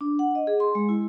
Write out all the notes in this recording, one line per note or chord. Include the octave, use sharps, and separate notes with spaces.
D4
F#5
D#5
G#4
C6
G#3
E4